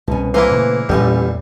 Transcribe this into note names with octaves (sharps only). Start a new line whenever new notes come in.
C2 B2 C#4
E3 A#3 E4 G#4 B4 C5
A#2 C#3 A3
A1 E2 A#2 E3 G3 C#4